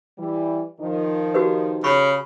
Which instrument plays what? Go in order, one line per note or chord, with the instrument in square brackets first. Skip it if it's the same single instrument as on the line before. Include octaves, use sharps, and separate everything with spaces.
[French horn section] E3 G3
D#3 F3 D#4
[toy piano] F#4 G4 B4
[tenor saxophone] C#3 [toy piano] B5 C#6